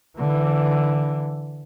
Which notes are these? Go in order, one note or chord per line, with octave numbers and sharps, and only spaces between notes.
D3 E3